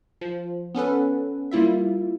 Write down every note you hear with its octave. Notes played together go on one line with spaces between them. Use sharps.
F3
B3 C#4 A4 B4
G3 A#3 E4 F4 E5